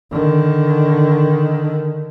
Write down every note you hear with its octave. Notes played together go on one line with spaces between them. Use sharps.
D3 D#3